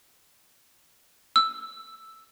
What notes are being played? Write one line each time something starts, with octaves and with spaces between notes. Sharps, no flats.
E6